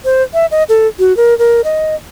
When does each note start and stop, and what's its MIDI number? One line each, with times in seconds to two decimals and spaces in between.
0.05 0.23 72
0.34 0.46 76
0.51 0.63 75
0.69 0.88 69
0.99 1.15 66
1.17 1.37 70
1.39 1.61 70
1.64 1.95 75